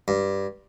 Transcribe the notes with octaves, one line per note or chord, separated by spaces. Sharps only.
G2